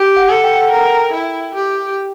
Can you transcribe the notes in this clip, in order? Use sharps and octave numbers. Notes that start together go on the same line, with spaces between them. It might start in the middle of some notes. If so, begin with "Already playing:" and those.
Already playing: G4
F#5
A4
G5
F#5
A#4 G5
E4
G4